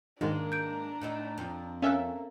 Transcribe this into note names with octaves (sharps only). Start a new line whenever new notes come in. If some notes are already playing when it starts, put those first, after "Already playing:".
G#2 D#3 G#3 A#3 D4 A#5
G6 D7
A2 A3 D#4
F2
A#3 C#4 A4 E5 F5 G#5 F#6